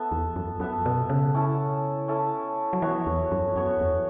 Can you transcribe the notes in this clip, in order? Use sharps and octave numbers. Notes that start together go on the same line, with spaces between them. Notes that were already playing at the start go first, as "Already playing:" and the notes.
Already playing: B3 A4 E5
E2
F#2
F#2 B3 A4 E5
B2
C#3
C#4 E4 A4
C#4 E4 A4
F#3
E3 B3 F#4 C#5 E5
E2
F#2
F#2 B3 F#4 C#5 E5
E2